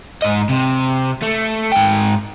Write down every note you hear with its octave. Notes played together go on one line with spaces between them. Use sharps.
G#2 D#5
C3
A3
G#2 G5